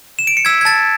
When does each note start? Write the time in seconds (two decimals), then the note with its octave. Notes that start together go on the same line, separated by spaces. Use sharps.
0.19 E7
0.27 D7
0.37 C#7
0.45 E6 G#6 B6
0.61 G#6
0.65 A5 A6